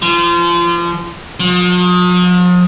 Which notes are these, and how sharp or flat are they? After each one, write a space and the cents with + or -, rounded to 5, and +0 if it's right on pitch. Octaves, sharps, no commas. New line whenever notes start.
F3 -30
F3 +45